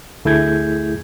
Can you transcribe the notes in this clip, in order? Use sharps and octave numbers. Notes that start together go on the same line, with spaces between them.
D2 A3 E4 G#4 G6 G#6